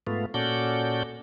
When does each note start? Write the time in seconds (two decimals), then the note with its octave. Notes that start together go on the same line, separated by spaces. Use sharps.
0.07 G#2 A3 B3 F4
0.34 A#2 C#4 F#4 A4 D5 G6